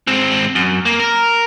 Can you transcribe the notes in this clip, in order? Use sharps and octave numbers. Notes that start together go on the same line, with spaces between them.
G#2 C4
F#2
A#3
A#4